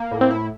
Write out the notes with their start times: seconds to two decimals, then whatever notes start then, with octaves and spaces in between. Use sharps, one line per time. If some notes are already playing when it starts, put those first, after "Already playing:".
Already playing: A#3
0.11 A2
0.21 C4
0.30 E4